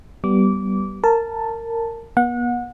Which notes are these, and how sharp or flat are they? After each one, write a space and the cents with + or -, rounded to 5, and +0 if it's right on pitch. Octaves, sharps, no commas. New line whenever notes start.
G3 -20 B3 -10 D6 -20
A#4 -20 A5 +0
B3 -40 F#5 -30